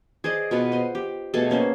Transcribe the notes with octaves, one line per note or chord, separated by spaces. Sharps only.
G#4 C5 D5 D#5
B2 F4 B4 F#5
C5 D#5
G4
B2 A3 G#4 A4
C#3 A#3 C#4 C5